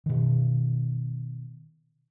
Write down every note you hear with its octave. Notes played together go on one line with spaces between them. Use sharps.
B2 D#3